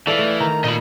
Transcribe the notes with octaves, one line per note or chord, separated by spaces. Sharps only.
E3 A4 D5 F5
A3
D#3 A#5
A#2 D#4 F4 D#5 B5